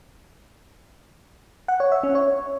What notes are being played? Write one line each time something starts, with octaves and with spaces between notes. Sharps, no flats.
F#5
C#5
E5
C#4
C#5